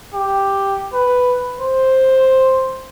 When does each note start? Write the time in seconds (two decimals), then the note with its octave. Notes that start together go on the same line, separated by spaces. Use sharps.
0.14 G4
0.94 B4
1.60 C5